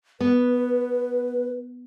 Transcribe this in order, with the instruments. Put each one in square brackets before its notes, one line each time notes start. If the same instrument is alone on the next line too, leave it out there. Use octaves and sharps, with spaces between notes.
[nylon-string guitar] B3 [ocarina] B4